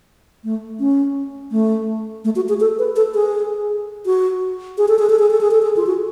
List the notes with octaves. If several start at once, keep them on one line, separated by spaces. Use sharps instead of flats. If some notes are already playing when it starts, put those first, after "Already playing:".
A3
C#4
A3
A3
F#4
G#4
A4
B4
A4
G#4
F#4
G#4
A4
G#4
A4
G#4
A4
G#4
A4
G#4
F4
F#4